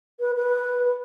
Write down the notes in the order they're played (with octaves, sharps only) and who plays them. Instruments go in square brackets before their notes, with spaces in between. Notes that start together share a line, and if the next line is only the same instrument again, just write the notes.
[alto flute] B4
B4